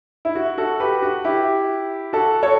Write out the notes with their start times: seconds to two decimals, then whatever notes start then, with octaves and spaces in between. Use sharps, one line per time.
0.25 E4
0.35 F#4
0.58 F#4 A4
0.80 G4 B4
1.02 F#4
1.25 E4 G4
2.13 F#4 A4
2.43 A4 C#5